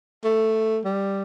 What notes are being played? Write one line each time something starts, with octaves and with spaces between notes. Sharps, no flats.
A3
G3